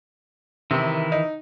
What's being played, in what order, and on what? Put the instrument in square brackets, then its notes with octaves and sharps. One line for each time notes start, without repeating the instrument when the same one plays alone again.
[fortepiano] C3 [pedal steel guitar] D#3 E3 E4
[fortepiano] D#4